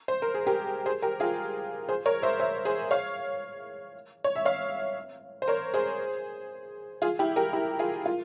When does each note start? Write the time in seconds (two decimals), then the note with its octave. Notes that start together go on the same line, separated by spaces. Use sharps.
0.08 C5
0.22 A#4
0.34 G#4
0.47 G4 A#4
0.86 G#4 C5
1.02 G4 A#4
1.20 F4 G#4
1.89 G#4 C5
2.06 A#4 C#5
2.22 C5 E5
2.39 C5 E5
2.65 G#4 C5
2.91 C#5 F5
4.24 C#5
4.36 E5
4.45 C#5 F5
5.42 C5
5.48 A#4 C#5
5.74 G#4 C5
7.02 F4 G#4
7.19 E4 G4
7.36 G4 A#4
7.53 E4 G4
7.79 F4 G#4
8.06 F4